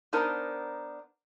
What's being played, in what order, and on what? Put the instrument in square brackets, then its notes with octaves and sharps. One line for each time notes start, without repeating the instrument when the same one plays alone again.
[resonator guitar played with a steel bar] B3 D4 D#4 A#4 C5